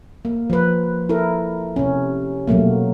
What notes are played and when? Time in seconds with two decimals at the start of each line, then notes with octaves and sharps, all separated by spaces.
0.25 A#3
0.50 F3 B4
1.09 E4 A4 A#4
1.76 C3 C#4
2.48 B2 F#3 A3 A#3